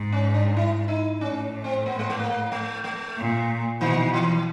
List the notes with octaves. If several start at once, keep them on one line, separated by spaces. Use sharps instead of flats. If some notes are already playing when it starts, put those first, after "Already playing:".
Already playing: G#2
C#4
D4
E4
D#4
A2 C#4
C4
B3
G#3
A3
A#3
A3
A3
A#2
B2 D#3
E3